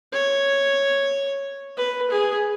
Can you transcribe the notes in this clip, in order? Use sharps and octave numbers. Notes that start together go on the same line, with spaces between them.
C#5
B4
G#4